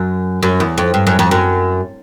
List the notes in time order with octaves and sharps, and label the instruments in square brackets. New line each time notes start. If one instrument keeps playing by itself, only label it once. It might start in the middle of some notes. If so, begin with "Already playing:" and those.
Already playing: [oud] F#2
F#2
E2
F2
G2
F#2
F2
F#2